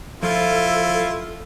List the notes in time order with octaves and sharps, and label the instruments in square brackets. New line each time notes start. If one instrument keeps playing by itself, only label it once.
[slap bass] F3 [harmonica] E4 F4 [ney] A4